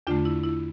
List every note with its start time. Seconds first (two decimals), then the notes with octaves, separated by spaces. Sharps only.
0.07 E2 D3 A3 D4 F4
0.25 E4
0.43 E4